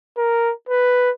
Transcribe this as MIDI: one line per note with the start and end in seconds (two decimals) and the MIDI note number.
0.17 0.52 70
0.69 1.10 71